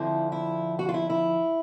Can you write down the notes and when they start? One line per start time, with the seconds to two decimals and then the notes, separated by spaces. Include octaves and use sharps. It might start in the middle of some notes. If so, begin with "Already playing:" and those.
Already playing: F2 D3 F3 E4
0.32 E4
0.79 F#4
0.89 F4
0.94 E4
1.10 E4